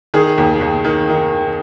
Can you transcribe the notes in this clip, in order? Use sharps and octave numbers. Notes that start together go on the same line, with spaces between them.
D#3 G#4
D#2
D#2
D#3
D#3